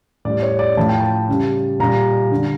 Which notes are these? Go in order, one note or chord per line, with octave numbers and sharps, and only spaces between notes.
A2 G3 D5
C#5
D5
A2 F3 A3 A5
G5
A5
C#3 G3
A#2 G3 A#5
D3 G3